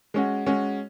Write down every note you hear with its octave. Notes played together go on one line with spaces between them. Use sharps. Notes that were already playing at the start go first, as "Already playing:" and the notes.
G#3 C#4 F#4
G#3 C#4 F#4